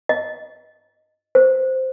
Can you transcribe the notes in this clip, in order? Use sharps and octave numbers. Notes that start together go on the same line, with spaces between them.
D#5
C5